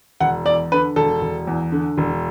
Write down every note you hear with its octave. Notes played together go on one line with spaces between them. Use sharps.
E1 F#5
E2 D5
D3 B4
E1 A4
E1
E2
D3
E1